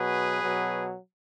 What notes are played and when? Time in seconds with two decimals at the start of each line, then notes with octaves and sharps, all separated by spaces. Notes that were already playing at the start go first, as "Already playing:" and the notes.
Already playing: B2 F#3 G#4 B4
0.42 B2 F#3